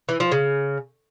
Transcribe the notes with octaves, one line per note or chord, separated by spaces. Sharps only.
E3
F3
C#3